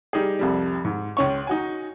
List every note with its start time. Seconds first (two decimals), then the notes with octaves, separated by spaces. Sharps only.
0.13 G3 D#4 G4 G#4
0.39 C2 F2 G3
0.85 G#2
1.17 C#2 C#4 C#6
1.47 D#4 F#4 G#5